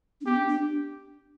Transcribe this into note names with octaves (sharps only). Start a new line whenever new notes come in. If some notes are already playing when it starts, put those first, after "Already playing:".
D4
B3 G4
D4
D4